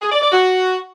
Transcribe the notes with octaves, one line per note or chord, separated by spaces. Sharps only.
G#4
D5
D5
F#4